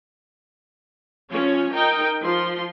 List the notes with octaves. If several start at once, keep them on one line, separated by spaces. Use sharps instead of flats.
F3 C#4 C#5
D#4 A#4 G5
F3 F4 C6